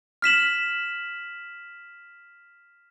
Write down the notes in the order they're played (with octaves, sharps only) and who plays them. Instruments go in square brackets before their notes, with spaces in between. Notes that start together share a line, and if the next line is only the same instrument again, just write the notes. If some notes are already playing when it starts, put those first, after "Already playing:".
[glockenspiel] F6 B6 E7 F#7